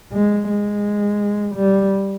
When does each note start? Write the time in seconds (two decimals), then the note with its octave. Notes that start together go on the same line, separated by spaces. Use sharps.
0.13 G#3
0.49 G#3
1.55 G3